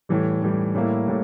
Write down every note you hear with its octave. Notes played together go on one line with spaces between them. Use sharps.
A2 E3 G3
A2 E3 G3
A2 G3 A#3 E4
A2 G3